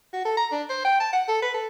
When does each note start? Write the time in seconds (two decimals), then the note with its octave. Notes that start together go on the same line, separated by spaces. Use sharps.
0.13 F#4
0.25 A4
0.37 A#5
0.52 D4
0.69 C5
0.85 G5
1.00 A5
1.13 F#5
1.28 A4
1.42 B4
1.54 A4